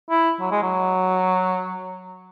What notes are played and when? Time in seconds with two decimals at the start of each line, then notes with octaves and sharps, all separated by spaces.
0.10 E4
0.40 F#3
0.51 G#3
0.63 F#3